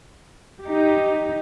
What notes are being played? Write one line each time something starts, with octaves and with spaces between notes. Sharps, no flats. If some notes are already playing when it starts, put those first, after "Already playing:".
D#4 G4